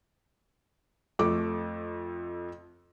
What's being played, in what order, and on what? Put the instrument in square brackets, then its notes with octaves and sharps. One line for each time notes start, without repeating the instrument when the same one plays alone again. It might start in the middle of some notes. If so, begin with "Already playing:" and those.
[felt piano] F2 A3 D6